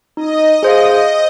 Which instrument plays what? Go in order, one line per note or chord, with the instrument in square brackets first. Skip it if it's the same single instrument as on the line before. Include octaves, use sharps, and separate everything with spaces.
[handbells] D#4 [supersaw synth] D#5
[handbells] G#4 C5 F5